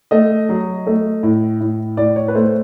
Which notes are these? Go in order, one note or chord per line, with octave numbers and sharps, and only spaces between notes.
A3 D#5
F#3
A3
A2
A2
A2 D5
C#5
B4
A3 C5